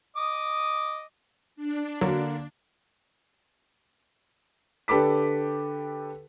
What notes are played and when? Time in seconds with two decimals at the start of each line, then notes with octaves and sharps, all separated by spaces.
0.16 D#5 D6 D#6
1.56 D4
2.01 D3 F#3 A#3
4.88 D3 G4 A4 B4 D6 B6